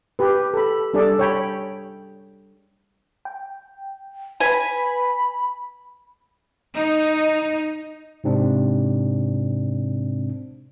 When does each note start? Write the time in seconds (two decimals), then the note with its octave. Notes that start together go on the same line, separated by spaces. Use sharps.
0.19 G4 B4
0.54 A4 B5
0.94 G3 D4 G#4 A4 D5
1.19 C#5 G5 B5
3.25 G5
4.40 B4 G#5 B5 B6
6.77 D#4
8.24 G#2 C3 C4 D4